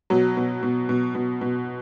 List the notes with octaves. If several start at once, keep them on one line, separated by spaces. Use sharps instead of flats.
B2 F#3
B2
B2
B2
B2
B2